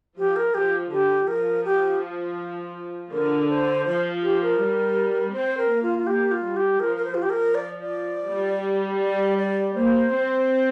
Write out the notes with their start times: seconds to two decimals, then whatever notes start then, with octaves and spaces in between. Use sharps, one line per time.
0.17 F3 G4
0.36 A#4
0.54 F3 G4
0.91 D3 G4
1.27 F3 A#4
1.65 G4
3.12 D3 A#4
3.49 C5
3.85 F3 C5
4.23 G4
4.42 A#4
4.60 G3
5.33 C4 C5
5.58 A#4
5.70 A#3
5.83 F4
5.98 F4
6.07 A#3 G4
6.31 F4
6.43 G3
6.57 G4
6.80 F3 A#4
6.96 A#4
7.05 C5
7.14 F4
7.17 F3
7.22 G4
7.30 A#4
7.55 D5
7.81 D5
8.28 G3
9.01 D5
9.38 D5
9.75 A#3 C5
10.11 C4